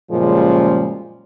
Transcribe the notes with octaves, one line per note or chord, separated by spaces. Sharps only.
F#2 A#2 C#3 F3 G3 G#3